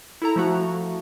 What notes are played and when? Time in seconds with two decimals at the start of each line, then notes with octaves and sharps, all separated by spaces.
0.22 E4 A4 A#5
0.36 F3 A3 F#4